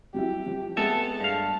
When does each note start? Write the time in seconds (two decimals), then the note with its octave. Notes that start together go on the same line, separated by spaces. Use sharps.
0.14 F#3 G3 E4 G4
0.46 F3
0.77 G#3 A3 B3 C4 A4 E5 A5
1.20 G2 F5